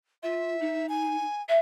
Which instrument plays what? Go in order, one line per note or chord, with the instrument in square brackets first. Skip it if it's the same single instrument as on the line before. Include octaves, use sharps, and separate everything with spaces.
[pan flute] F4 [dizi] E5
[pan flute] D#4
[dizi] G#5
[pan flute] E5